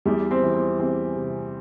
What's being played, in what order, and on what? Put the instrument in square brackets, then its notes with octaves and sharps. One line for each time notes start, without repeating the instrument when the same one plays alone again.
[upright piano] E2 G3
C4
E3
C4
E2 C4
C3